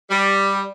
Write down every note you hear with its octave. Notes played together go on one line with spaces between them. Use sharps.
G3